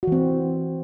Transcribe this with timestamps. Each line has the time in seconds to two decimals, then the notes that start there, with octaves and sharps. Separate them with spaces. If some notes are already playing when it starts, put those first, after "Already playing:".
0.03 F#4
0.07 E3
0.12 C4